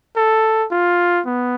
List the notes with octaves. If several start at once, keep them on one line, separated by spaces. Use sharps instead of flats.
A4
F4
B3